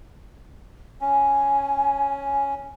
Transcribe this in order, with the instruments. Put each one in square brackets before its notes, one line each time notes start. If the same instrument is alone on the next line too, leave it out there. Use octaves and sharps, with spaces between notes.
[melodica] C#4 [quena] G#5